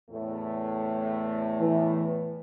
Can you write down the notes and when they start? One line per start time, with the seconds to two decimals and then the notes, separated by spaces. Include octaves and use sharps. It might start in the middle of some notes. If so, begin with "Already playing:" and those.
0.11 E2 A2 A3
1.60 E3